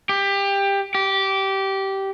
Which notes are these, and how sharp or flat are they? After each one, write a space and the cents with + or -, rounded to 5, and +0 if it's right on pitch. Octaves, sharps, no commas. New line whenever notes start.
G4 +20
G4 -15